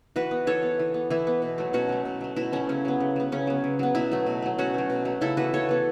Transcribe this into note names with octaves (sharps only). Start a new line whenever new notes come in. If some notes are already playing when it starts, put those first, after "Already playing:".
E3 F#4 B4
B3
E3 A4 C#5
B3
E3
B3
E3 E4
B3
B2
F#3 A3
B2 C#4 F#4
F#3 A3
B2
F#3 A3
B2 E4
F#3 A3 C#4
C#3 C#4
F#3 B3
C#3
F#3 B3
C#3 C#4
F#3 B3
C#3
F#3 B3
B2 E4
F#3 A3
B2
F#3 A3
B2 C#4 F#4
F#3 A3
B2
F#3 A3
C#3 E4 A4
E3 B3 F#4 B4
C#3 A4 C#5
E3 B3